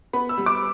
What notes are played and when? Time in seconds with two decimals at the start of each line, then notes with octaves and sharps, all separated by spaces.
0.13 B3 B5
0.29 E6
0.38 G3
0.46 D6